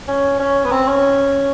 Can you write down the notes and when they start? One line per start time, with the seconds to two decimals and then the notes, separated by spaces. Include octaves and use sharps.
0.08 C#4
0.40 C#4
0.64 B3
0.72 C4
0.88 C#4